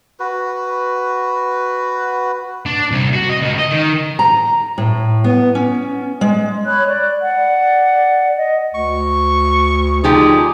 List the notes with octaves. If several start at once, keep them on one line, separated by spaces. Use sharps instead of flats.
F#4 B4
D4
C2
F#4
D#5
C#2
D#5
D#3
A#5
A2
B3
C#4
G#3
C#5 B5 F#6
D5
D5 F#5
D#5
D2 C#6
D3 F3 D#4 G4 G#4